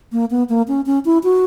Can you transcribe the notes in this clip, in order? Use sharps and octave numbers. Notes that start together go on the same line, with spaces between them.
A#3
B3
A#3
C#4
C#4
E4
F#4